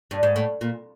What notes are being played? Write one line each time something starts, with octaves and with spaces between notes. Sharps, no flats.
G2
G#2
A2
A#2